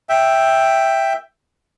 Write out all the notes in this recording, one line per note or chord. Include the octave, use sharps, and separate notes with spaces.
E5 G5